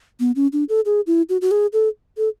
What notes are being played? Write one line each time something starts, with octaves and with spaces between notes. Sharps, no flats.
B3
C#4
D4
A4
G#4
E4
F#4
F#4
G#4
A4
A4